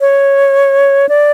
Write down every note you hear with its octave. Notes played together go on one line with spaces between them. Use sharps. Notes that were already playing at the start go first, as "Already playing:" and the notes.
C#5
D5